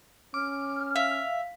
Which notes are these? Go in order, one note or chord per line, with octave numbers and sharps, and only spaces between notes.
C#4 D6 F6
E5 F5